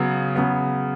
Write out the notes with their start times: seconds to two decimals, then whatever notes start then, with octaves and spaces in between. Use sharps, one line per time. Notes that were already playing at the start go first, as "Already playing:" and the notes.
Already playing: C#3 F#3 B3
0.35 C#3 F#3 B3